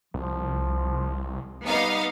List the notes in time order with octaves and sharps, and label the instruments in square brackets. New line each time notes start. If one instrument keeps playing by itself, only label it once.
[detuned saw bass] C2 [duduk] F3
[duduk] G3 [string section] B3 D#4 F5